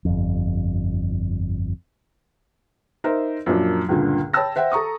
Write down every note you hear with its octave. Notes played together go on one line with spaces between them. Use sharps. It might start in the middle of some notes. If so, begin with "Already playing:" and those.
G1 F2
D#4 A#4 C5 E5
F#2 A#2 F3 F#3 D4
C#2 G2 A#2 D3
C#5 G5 A5 B5 E6 A#6
C5 E5 F#5 G5
A4 A#5 C#6 D#6